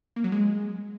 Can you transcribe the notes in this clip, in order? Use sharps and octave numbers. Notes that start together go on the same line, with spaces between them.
A#3
F#3
G#3